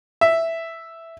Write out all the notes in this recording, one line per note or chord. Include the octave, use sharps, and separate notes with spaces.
E5